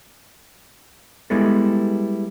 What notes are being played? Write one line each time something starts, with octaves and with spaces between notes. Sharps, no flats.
G3 G#3 B3 E4 A4